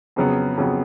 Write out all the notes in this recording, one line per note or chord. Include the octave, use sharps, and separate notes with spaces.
F2 C#3 F#3 B3
F2 C#3 F#3 B3